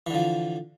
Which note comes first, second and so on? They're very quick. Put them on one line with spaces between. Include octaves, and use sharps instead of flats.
E3 D3 F3